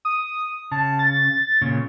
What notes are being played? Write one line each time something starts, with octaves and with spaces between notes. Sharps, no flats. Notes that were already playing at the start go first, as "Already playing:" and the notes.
D#6
C#3 A5
A6
A#2 C#3